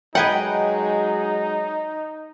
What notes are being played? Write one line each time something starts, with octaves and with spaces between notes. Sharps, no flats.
F#3 G#3 D#4 G#4 B4 F#5 G5